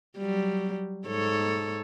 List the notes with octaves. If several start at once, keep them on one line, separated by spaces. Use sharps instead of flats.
F#3 G3
G#2 A4 C#5